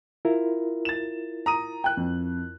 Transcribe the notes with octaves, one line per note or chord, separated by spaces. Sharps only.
E4 F4 A#4
A6 E7
A#5 D#6 D#7
G5 F#6
F2